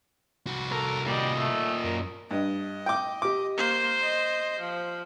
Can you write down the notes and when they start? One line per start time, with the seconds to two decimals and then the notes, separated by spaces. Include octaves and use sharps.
0.47 C2 F#4
0.72 A4 A#4
1.07 A#2 G3 D#5
1.37 A3
1.85 F#2 A#4
2.31 G2 D#5
2.86 G5 D6
3.22 G4 D6
3.57 A#3 C5
4.01 D#5
4.59 F3